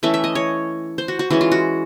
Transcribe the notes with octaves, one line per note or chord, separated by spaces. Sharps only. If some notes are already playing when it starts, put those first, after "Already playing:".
E3 A3 C#4 E5
E5
D#5
C#5
C5
F#4
F#4
E3 G#3 C#4 F#4
F4
F#4